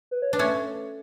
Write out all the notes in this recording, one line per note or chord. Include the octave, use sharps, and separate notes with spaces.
B4
C#5
D4 B4
A3 C#4